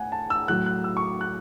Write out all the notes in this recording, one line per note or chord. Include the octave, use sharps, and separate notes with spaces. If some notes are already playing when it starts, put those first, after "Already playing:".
Already playing: A2 F#5 G#5
A5
E6
A2 F#3 F#6
F#6
E6
C#6
D6
F#6